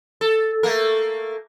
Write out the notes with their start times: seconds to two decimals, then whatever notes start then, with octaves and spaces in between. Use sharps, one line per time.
0.21 A4
0.63 A3 A#3 A#4